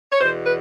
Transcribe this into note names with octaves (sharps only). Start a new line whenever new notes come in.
C#5
E2 B2 C5
B4